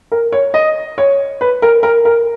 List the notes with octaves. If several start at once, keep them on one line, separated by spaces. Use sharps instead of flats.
A#4
C#5
D#5
C#5
B4
A#4
A#4
A#4